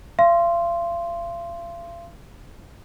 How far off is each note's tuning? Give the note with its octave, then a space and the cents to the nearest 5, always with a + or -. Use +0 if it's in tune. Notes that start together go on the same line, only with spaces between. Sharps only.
F5 -40 C6 +0